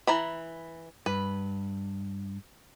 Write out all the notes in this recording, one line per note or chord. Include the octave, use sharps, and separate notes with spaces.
E3 A#5 B5
G2 B4